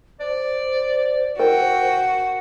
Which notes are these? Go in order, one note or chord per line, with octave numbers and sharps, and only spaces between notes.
C5 D5
F#4 A#4 G5